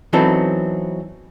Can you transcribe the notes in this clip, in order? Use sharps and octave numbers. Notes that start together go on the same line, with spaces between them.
E3 F#3 B3 C4 D#4 A4